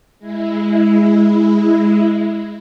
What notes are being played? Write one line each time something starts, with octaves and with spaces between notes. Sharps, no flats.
G#3 E4